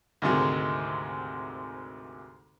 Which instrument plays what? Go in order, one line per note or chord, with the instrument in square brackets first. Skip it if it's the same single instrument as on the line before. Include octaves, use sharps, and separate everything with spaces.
[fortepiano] D2 G#2 C3 D#3 G#3